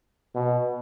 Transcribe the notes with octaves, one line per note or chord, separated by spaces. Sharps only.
B2